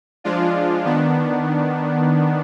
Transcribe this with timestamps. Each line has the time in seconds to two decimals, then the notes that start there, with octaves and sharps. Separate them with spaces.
0.24 F3 G#3 D4 F4
0.85 D#3 B3 D4